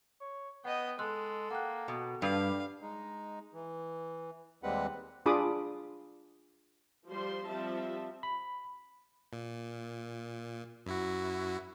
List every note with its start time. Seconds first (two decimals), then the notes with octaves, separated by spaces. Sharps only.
0.21 C#5
0.65 B3 D#5 F#5 G5
0.99 G#3 A4 C6 E6 F#6
1.51 A#3 F#5 G5 F#6
1.88 B2
2.22 G2 G4 F5
2.82 G#3 D#4
3.54 E3
4.63 D#2 G3 G#3 C4 B4 F#5
5.26 D4 F4 G#4 B5 D6 D#6
7.09 F3 G3 C5 C6
7.47 F3 G3 C4 E5 A5
8.23 B5
9.33 A#2
10.86 F#2 E4 F#4